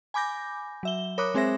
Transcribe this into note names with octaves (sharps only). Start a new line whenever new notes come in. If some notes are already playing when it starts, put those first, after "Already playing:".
G#5 B5 D6 G6 A#6
F#3 E5 G7
A#4 C#5 B5 D6 D#6 F#6
G#3 C4 G#4 C5 E5 A#6